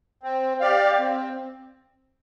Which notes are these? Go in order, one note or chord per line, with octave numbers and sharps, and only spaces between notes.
C4
G4 D5 F5
C4